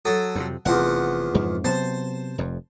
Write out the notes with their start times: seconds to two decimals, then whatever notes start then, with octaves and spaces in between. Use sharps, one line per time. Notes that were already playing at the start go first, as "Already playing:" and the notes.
0.05 F#3 A4 D#6
0.35 F2 A2 C3
0.66 F1 E2 F3 F#5
1.34 F2 G#2 C#3
1.64 C3 F#3 B3 C5 A5
2.38 F1 F2